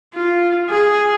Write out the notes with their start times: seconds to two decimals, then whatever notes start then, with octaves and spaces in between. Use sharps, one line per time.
0.14 F4
0.69 G#4